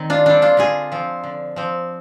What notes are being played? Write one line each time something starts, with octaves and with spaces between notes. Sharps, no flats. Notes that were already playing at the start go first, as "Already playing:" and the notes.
Already playing: D#3 C4
D4 F4
G3 C4 D4
D4 F4
D3 F4 G#4
F3 C4
D3
F3 C4